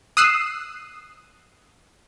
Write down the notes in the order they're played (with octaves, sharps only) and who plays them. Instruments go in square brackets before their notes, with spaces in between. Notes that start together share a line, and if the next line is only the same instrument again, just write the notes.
[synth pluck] D#6 E6 F#6 C7 D#7 E7